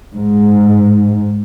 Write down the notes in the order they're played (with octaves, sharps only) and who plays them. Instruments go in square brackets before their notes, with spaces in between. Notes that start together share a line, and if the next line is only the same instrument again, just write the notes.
[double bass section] G#2